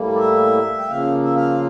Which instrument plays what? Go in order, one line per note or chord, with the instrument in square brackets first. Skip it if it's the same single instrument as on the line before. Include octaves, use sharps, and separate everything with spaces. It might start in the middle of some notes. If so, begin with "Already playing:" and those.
Already playing: [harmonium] A2 G3 A#3
D5
E5
G5
C#3 F3 A#3 F5
E5
F5